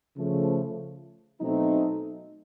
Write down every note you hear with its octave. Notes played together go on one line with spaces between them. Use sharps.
C#3 F3 A3
B2 F#3 A3 C4 D#4